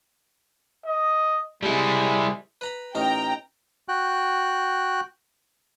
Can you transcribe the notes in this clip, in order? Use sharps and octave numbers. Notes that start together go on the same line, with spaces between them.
D#5
G3 G#3 E4
B4 A#5 B5
A1 D#4 A#4 G5 A#5
F#4 G5 F#6